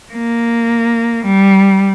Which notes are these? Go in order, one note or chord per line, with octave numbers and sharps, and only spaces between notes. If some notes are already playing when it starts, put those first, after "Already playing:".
A#3
G3